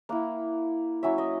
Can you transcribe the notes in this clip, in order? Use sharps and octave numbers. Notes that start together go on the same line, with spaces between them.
A#3 E4 F#5
F#3 C#4 E4 E5
D#5